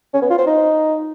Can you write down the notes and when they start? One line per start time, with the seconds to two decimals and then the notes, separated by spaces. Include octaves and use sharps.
0.14 C#4
0.22 B3
0.30 F4
0.38 C5
0.47 D#4